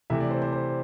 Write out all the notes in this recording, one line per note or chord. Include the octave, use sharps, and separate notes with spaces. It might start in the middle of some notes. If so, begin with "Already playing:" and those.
C3 E3 A3 E5
D5
C5
C5
C5